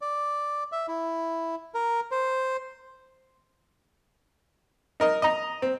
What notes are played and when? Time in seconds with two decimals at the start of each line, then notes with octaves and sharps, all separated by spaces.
0.01 D5
0.72 E5
0.88 E4
1.74 A#4
2.11 C5
5.00 D#4 A#4 D#5
5.22 D#5 A#5
5.62 C4